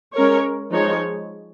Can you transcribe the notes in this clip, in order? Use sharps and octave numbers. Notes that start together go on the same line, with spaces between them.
G#3 C#4 A#4 C#5
F3 G#3 D#4 C#5